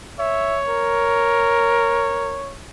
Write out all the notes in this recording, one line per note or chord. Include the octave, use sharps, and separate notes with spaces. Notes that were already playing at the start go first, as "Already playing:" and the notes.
C#5 E5
A#4